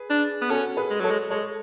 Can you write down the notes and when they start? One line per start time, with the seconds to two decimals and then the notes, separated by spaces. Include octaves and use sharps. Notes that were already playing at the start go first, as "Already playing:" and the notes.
Already playing: G#4 B4
0.10 D4
0.42 B3
0.50 C#4 F#4 A4
0.77 G#4 B4
0.90 G#3
1.00 F#3 A4 C#5
1.11 G#3
1.30 G#3 A4 C#5